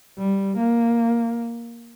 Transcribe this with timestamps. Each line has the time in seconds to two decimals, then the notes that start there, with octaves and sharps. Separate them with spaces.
0.18 G3
0.57 A#3